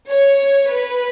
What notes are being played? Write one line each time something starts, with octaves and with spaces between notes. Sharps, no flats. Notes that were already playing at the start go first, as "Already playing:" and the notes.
C#5
B4